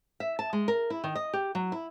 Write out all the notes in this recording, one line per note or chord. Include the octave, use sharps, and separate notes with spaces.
E5
A5
G#3
A#4
E4
D#3
D#5
G4
F#3
E4